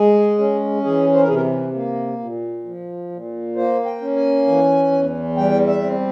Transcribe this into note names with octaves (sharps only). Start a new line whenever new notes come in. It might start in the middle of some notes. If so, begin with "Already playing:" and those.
Already playing: G#3 G#4
C#4
E3 G#4
C5
A#4
C3 G#4
A#4
A#3
A#2
F3
A#2
A#3 C5
G5
C#4
G#5
E3
E2
G3 G5
E5
C4